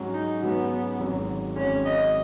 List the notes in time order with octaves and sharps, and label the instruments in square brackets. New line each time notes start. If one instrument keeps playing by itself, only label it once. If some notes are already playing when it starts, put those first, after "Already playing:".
Already playing: [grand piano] G#2 F#3 C#4 F#4
[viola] D#4
[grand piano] G#2 F#3 C#4 F#4 [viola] B3
[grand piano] G#1 G#2 F#3
[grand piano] G#1 G#2 F#3 [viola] C#4
[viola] D#5